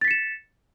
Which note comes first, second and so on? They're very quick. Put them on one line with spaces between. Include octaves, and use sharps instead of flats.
A6 B6 C#7 E7